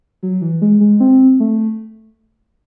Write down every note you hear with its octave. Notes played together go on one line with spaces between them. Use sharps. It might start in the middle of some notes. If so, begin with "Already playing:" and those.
F#3
E3
G#3
G#3
C4
A3